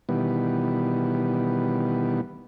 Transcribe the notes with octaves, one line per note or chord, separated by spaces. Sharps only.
B2 D#3 E3 G3 B3